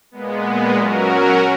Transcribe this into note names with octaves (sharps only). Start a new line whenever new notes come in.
A#2 G#3 B3
F#3 C#4 F#4 A#4